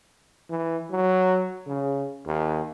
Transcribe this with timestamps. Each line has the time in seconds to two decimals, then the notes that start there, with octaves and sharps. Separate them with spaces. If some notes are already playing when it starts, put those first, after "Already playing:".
0.50 E3
0.91 F#3
1.67 C#3
2.27 D#2